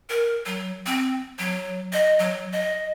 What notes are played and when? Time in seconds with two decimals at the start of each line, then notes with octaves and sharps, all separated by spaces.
0.10 A#4
0.46 F#3
0.86 C4
1.39 F#3
1.93 D#5
2.19 F#3
2.52 D#5